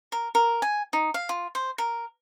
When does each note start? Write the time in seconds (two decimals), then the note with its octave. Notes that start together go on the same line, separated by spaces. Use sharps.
0.12 A#4
0.35 A#4
0.62 G#5
0.93 D#4
1.14 F5
1.29 F4
1.55 C5
1.78 A#4